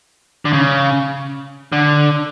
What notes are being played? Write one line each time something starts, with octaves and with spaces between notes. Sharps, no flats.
D3
C#3
D3